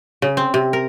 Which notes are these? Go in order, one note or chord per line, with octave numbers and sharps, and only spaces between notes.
C#3
C4
C3
A#4